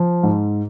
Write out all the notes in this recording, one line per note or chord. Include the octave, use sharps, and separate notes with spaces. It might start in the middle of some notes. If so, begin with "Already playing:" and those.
Already playing: F3
G#2